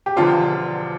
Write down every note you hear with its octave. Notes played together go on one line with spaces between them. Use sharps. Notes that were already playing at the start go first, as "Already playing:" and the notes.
G4
E1 E2 D3 F3 D4 F4